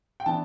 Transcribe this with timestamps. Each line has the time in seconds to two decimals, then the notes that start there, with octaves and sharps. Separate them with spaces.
0.20 G5
0.26 E3 B3 D4 A5